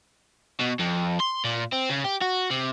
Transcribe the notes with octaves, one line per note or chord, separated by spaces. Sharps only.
B2
F2
C6
A#2
C4
C#3
G4
F#4
C3